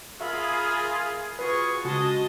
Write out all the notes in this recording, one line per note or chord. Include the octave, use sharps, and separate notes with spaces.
F4 G#4 A#4 E5 B5
F4 F#4 G#4 B4 C#6
C#3 G#3 F#4 D#5 A5 C#6